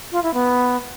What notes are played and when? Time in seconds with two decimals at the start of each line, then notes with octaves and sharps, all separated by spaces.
0.12 F4
0.23 E4
0.34 B3